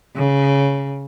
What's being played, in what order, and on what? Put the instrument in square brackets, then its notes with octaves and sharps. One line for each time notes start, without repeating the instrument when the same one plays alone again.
[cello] C#3